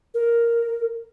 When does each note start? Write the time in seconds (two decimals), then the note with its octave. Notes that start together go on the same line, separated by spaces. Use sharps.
0.14 A#4